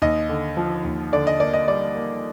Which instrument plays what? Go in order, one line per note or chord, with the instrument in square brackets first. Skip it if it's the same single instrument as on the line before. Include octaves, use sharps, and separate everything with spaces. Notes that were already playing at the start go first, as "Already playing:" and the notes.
[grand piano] D#2 D#5
D3
F3
D#2
D3 D5
D#5
A#3 D5
D#5
G3 D5
A#3